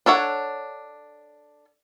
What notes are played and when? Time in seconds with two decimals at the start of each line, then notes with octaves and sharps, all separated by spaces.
0.06 D4 A4 C#5 F#5